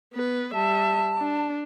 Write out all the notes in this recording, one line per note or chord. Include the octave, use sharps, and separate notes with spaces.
B3 B4
G3 E5 A5
D4